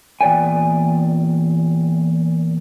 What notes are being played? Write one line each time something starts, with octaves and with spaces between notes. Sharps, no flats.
E2 A#2 D5 G5 G#5